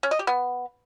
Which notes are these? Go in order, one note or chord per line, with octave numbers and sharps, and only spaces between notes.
C#4
D#5
G4
B3